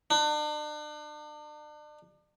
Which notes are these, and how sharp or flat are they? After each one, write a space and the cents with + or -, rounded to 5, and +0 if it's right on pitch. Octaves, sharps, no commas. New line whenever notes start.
D4 +40